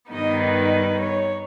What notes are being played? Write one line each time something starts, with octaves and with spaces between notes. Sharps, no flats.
G2 D#3 G3 B3 D#4 D#5
B4
C#5